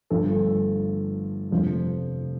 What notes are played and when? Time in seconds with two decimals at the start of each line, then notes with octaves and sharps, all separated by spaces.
0.10 G1 G2 F3 A3 A4
1.51 F1 F2 D3 F3